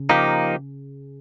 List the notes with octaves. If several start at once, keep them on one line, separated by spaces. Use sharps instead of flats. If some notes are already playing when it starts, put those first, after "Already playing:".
Already playing: C#3
F3 A#3 D#4 G4